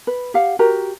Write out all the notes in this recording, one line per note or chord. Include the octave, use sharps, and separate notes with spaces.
B4
G4 F5 F#5
F#4 G4 A#4 A#5